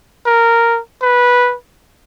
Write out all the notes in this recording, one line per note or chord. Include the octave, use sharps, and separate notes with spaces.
A#4
B4